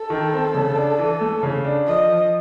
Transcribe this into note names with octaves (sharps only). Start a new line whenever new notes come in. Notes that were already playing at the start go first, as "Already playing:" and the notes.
Already playing: A4
D#3
C4
C#3
D4
E3
A3
C#3
D4
F3 D#5
F3